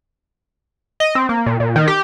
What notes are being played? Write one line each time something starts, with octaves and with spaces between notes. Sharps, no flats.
D#5
C4
A#3
A#2
A#2
D#3
G4